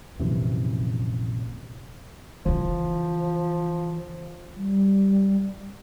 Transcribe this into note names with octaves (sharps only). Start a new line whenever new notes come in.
A#1 F#2 C3 E3
C#3 E3 F3
G3